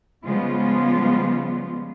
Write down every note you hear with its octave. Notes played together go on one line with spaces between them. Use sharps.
C#3 F3 G3 G#3 B3 F4